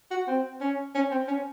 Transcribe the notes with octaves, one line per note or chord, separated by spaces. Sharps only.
F#4
C4
C#4
C#4
C4
C#4